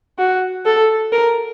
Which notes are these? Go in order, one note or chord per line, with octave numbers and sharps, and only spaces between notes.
F#4
A4
A#4